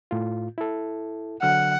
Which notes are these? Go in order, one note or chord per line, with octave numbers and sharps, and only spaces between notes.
A2 F4
E4 A4
D3 F#3 F#5 F6